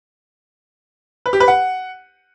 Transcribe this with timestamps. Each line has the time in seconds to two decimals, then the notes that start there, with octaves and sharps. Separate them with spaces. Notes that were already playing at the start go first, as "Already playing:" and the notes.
1.26 B4
1.33 G4
1.40 B4
1.48 F#5